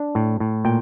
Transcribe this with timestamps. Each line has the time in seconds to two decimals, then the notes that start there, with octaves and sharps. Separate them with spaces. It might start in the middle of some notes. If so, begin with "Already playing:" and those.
Already playing: D4
0.15 A2
0.40 A2
0.65 A#2 G5